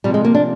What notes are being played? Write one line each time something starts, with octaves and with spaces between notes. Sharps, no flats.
C3 F3 G3
G#3
A#3
D4